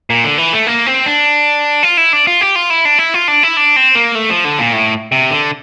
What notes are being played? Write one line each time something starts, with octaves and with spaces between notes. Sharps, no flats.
A#2
D3
E3
A3
A#3
C4
D4
F4
E4
D4
F4
G4
F4
E4
D4
E4
F4
D4
E4
D4
C4
A#3
A3
F3
D3
A#2
A2
C3
D3